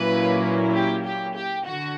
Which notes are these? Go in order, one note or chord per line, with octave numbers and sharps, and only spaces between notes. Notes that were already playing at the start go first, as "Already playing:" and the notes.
Already playing: A#2 F#3 A#3 C#4 E4 B4
G4
G4
G4
D3 F#4